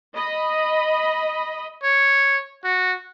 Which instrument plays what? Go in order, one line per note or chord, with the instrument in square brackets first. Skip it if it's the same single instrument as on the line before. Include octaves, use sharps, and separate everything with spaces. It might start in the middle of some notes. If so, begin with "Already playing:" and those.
[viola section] D#5 B5
[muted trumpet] C#5
F#4